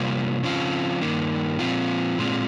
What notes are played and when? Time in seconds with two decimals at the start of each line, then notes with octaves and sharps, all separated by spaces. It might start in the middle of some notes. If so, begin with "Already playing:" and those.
Already playing: C3 G3 A#3 F4
0.43 C#3 F3 C4 F4
1.01 G2 D#3 A#3
1.59 A#2 F3 C4 F4
2.18 A#2 G#3 C4 F4